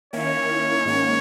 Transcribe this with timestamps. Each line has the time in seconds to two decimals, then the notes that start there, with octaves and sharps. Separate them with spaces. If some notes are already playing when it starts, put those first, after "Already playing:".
0.13 D#3 A#3 C#4 E4 C#5
0.86 G#2 D#3 A#3 C#4